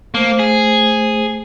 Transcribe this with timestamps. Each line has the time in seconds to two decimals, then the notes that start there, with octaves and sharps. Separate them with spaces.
0.14 A3 A#3 C5
0.39 G#4